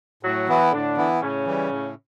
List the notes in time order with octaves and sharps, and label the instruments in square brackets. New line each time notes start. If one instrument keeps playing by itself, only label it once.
[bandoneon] A2 [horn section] F#3 F#4
[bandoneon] E3 B3 E4
[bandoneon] A2 [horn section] D3 D4
[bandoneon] E3 B3 E4
[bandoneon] A2 [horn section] C#3 C#4
[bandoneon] E3 G3
A2